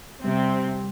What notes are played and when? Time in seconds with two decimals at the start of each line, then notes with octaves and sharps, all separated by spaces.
0.24 C3 G3 C4